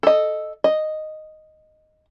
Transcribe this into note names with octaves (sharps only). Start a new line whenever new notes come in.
A4 D#5
D#5